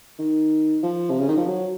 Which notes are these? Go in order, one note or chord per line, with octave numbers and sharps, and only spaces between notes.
D#3
F3
C3
C#3
D#3
F3
F#3